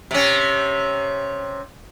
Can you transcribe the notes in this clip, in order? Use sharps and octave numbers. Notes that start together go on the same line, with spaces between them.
C3 C#4